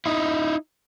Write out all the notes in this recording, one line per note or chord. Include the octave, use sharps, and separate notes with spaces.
D#4 E4